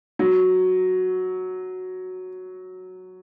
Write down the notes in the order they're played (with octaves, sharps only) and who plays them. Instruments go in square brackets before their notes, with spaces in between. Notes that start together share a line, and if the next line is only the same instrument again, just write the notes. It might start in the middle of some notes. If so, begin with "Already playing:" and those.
[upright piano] F#3